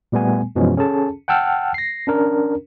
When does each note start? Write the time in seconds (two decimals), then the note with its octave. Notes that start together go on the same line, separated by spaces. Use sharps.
0.12 A#2 G3 A3 B3 G#5
0.55 F#2 B2 E3 F3 G#3 C#4
0.77 C#4 G#4 A4 A5
1.28 F#5 G5 A5 E6 F6
1.74 A#6 C7
2.07 C#4 D4 A#4